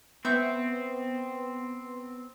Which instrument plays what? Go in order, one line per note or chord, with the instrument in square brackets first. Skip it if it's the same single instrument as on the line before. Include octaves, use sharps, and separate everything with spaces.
[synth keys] B3 [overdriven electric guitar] C4 [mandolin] E5 C#6 G6